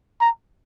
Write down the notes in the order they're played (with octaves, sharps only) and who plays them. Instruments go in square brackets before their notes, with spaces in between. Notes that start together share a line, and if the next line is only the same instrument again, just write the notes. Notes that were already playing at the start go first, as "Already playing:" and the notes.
[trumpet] A#5